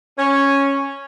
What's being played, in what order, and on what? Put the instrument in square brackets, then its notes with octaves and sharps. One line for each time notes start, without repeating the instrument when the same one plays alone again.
[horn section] C#4